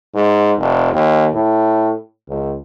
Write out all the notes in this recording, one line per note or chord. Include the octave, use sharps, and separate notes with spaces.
G#2
F1
D#2
A2
C#2